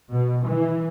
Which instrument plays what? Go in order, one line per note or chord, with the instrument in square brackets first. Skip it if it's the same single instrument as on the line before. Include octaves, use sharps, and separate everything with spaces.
[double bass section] B2
E3